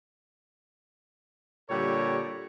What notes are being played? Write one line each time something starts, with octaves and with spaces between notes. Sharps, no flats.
A#2 D3 G3 G4 A4 C#5